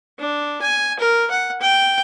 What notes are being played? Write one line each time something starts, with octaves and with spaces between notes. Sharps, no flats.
D4
G#5
A#4
F#5
G5